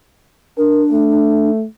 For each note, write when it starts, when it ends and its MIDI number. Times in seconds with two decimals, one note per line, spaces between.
0.58 1.50 62
0.58 0.83 70
0.92 1.65 57